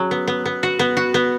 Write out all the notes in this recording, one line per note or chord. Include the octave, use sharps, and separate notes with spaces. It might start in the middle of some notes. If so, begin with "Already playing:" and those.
Already playing: F#3 C#4 G#4
B3
B3
B3
F#4
B3
F#4
B3